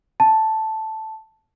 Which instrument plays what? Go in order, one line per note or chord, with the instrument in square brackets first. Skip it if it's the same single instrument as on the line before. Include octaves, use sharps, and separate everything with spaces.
[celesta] A5